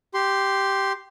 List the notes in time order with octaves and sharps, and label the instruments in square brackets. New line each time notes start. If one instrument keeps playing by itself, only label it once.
[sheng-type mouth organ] G4 C6